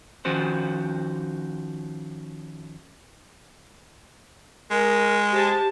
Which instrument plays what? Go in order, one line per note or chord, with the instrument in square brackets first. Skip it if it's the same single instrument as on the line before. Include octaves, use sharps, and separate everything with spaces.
[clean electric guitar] D#3 F3 C#4 F#4 C5
[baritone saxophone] G#3 [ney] A#4
[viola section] G4 A5 [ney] C5